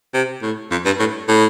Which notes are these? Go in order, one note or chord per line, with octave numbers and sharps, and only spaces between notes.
C3
A2
F2
G2
A2
A2